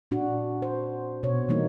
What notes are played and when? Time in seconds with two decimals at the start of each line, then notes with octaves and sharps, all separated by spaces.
0.11 A#2 D4 F#4
0.62 C5
1.23 B2 C#5
1.49 E3 G3 A#3 D#4